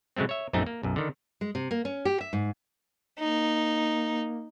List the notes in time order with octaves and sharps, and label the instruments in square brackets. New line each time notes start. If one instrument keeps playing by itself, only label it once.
[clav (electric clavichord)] C#3 F#3 G#3 A3 C4
C#5 E5
A#1 F#2 A3 C4 D#4
A#3
B1 F#2
D3 D#3
[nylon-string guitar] G#3
C3
A#3
C#4
G4
E5
G#2
[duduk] A#3 [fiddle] D#4